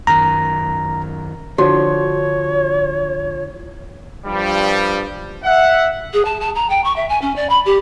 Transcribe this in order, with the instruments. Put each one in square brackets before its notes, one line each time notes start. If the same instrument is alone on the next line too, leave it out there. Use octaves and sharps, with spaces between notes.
[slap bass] F#2 D#3 [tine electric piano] A#5
[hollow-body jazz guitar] D3 [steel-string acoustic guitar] F3 [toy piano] F#4 [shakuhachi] C#5
[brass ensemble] G2 F3 G3
E5 F#5
[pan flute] G#4
A5
A5
A#5
G5
C#6
E5
G#5
C#4
D5
B5
G4